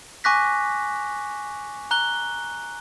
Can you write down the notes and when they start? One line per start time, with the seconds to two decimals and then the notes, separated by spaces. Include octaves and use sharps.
0.24 G#5 C#6 D6 F#6 A#6 B6
1.91 A#5 F#6 G7